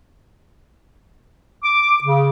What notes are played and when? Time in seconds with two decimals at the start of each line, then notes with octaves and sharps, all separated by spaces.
1.63 D6
2.03 C#3